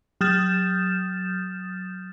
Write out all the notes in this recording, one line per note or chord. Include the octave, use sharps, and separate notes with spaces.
F#3 D#6 F6 G6 A6 E7